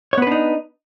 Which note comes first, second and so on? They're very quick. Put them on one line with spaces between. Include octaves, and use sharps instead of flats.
C#5 B3 B4 D4 D#4